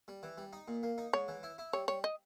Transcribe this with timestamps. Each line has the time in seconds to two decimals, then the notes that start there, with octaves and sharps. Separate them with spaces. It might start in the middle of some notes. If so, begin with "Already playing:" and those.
0.08 G3
0.23 E3
0.38 G3
0.53 D#4
0.68 A#2
0.83 A#3
0.98 D#4
1.13 G#2 C#5
1.28 E3
1.43 E4
1.58 E4
1.73 G3 C#5
1.88 G3 C#5
2.04 D#5